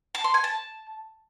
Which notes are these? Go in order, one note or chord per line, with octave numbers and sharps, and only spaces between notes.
A5
C6
G#5
A5